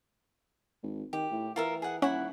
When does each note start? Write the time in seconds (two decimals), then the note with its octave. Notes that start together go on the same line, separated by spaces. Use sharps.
0.83 G#1
1.13 D#3 G4
1.31 A2
1.56 E3 F4 A#4 E5
1.82 G#4 F#5
2.02 D#1 C#4 E4 F#5